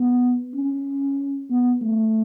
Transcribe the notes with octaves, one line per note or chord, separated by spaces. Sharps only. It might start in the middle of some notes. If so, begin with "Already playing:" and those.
Already playing: B3
C#4
B3
A3